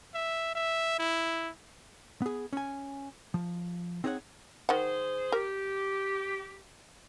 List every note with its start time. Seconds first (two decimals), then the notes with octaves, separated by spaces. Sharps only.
0.14 E5
0.55 E5
0.99 E4
2.22 B3 G#4
2.53 C#4 G#5
3.34 F3
4.04 C4 D#4 G#4 C#5 D5 F#5
4.69 D#3 G#4 C5 F#5
5.32 G4 A#4